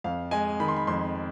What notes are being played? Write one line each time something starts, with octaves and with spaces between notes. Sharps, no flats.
F2 F5
G#3 G#5
D#3 B5
C6
B5
F2 C6